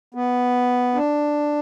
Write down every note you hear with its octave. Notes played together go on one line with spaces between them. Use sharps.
B3
D4